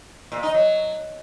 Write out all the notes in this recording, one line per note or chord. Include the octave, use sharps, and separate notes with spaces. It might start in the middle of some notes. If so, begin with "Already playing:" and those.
A#2
D#4
F#3